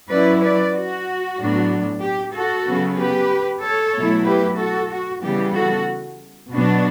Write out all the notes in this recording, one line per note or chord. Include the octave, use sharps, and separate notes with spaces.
F#3 C#4 E4 B4 D5
B4 D5
F#4
A2 F#3 B3 D4
G4
F#4 A4
C#3 F#3 B3
G4 B4
A4 C#5
B2 F#3 A3 E4
G4 B4
F#4 A4
F#4
C#3 E3 G3 B3 G4
F#4 A4
B2 F#3 B3 D4 F#4